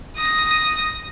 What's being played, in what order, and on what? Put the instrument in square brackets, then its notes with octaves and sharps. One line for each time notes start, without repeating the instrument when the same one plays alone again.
[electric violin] D#6 A#6